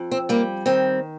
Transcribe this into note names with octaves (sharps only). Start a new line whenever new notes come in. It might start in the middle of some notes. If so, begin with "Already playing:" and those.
Already playing: F2
C4
G3 A#3
D#3 C4